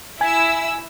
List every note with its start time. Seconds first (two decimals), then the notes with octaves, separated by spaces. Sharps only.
0.21 E4 G#5 E6 G#6